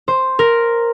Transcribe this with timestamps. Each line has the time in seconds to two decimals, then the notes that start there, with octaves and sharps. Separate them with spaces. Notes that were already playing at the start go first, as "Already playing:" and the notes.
0.08 C5
0.39 A#4